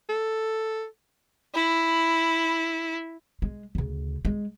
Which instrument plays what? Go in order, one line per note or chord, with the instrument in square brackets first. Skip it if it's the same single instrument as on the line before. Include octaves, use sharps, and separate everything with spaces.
[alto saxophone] A4
[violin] E4 [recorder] B5
[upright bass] G#3
D2 C#3
G#3